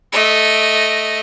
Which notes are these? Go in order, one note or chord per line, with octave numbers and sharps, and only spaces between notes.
A3 D#5